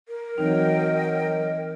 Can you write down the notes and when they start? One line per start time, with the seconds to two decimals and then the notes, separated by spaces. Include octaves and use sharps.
0.08 A#4
0.38 E3 F#3 C4 D#4 D#5 G5